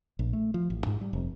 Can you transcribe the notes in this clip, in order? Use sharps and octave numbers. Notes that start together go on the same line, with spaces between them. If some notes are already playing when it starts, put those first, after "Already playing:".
A#1
A3
F3
A1
G#2
G3
F1